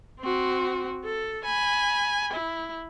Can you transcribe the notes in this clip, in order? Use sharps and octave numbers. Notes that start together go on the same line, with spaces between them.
C4 F#4
A4
G#5 B5
E4